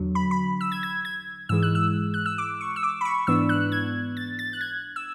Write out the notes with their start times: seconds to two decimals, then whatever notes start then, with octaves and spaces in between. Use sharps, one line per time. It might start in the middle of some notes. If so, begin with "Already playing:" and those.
Already playing: E2 D3 F#3
0.15 B5
0.31 B5
0.61 E6
0.72 G#6
0.83 G#6
1.05 G#6
1.49 G#2 E3 G#3 E6
1.62 F#6
1.75 E6
2.14 F#6
2.26 E6
2.38 D6
2.61 C#6
2.76 E6
2.83 D6
3.01 B5
3.05 C#6
3.27 G#2 E3 B3 D4 E6
3.49 F#6
3.72 G#6
4.17 A6
4.39 A6
4.53 F#6
4.61 G#6
4.96 E6